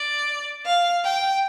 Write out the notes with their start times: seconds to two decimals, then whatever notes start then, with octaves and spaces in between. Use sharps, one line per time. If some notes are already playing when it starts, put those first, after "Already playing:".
Already playing: D5
0.65 F5
1.04 G5